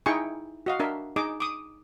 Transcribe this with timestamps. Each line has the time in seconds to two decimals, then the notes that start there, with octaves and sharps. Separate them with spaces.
0.06 D#4 E4 G#4 G5 G#5 C#6
0.66 F#4 D#5 F5
0.80 D4 A#4 E5
1.16 D#4 G#4 D#5 D6
1.40 D6 D#6